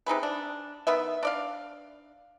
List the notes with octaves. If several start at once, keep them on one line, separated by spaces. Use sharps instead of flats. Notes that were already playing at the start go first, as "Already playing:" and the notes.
C3 D#4 G#4 B4
D4
D#3 B3 B4 E5
D4 D5 F5